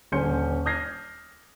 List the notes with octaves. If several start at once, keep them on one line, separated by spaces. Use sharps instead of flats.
D#1 D3 C#4 C6 G6 C#7
D#6 F6 G6 G#6 A#6 C7